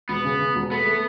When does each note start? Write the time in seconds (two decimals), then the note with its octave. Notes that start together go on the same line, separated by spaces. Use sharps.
0.09 E1 B3
0.25 C#3
0.40 C#3
0.55 E1
0.71 A3 B3
0.87 A3